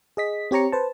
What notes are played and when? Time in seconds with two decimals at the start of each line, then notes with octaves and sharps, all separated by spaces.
0.17 G#4 D#5 B6
0.51 C4 G4 C#5 A#5 C#7
0.72 B4 C5 A5